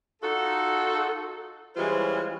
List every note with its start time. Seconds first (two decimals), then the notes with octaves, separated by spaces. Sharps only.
0.22 D#4 F4 F#4 A4
1.76 E3 G3 G#3 C#4 F4 C5